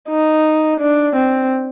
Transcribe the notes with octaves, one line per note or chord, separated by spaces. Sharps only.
D#4
D4
C4